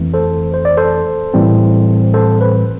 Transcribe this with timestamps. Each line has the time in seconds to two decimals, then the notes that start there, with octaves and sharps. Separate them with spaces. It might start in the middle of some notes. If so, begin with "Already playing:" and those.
Already playing: F2 E3 A3 C4
0.14 A4 C5
0.54 C5
0.65 D5
0.77 A4 C5
1.34 A2 E3 G3 C4
2.14 A4 C5
2.41 B4